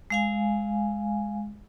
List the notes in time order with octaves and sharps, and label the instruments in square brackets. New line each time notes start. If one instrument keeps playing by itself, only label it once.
[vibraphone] G#3 F5 G#5